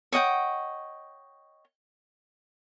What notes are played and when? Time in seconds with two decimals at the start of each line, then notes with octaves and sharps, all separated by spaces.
0.12 C#5 D#5 F#5 G5